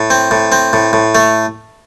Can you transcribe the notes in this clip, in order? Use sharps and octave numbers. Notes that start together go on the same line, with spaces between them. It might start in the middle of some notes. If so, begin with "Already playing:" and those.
Already playing: A2
C4
A2
C4
A2
A2
A3